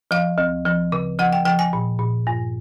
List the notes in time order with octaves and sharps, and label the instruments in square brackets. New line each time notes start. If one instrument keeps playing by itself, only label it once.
[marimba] F3 F5
D2
F3
C#3
F3 F#5
G5
F3 G5
G#5
A#2
A#2
G2